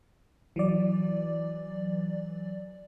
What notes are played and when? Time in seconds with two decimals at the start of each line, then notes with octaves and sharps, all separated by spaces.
0.56 E3 F#3 D5